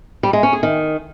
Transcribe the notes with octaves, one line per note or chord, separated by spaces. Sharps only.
G3
G#3
C#4
G#4
D#3